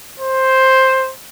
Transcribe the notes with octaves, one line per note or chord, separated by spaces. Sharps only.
C5